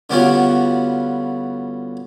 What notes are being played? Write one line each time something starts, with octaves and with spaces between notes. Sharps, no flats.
D3 G3 B3 C#4 F4 F#4